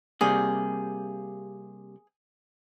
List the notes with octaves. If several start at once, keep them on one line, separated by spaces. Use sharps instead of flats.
C3 G3 A#3 G#4